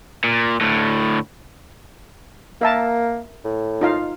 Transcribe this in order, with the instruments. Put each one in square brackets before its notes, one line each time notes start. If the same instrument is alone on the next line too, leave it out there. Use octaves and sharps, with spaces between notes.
[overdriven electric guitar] A#2
D2 A2
[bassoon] A#3 [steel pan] A#4 E5 A5
[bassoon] A2
[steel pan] D#4 F4 F5